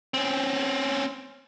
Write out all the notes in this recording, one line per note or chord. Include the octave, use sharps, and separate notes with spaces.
C4 C#4